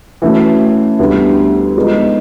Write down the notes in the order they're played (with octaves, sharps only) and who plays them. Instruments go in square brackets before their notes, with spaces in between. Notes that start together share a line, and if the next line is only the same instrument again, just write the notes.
[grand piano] E3 A3 C#4 F#4
D2 D3 G3 B3 E4
F3 G#3 B3 D#4